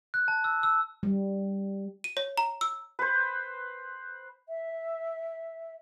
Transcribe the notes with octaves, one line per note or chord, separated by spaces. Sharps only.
F#6
A5
E6
E6
G3
D#7
C#5
A#5
E6
B4 C5
E5